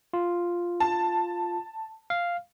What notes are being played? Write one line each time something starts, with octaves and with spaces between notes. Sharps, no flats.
F4
A5
F5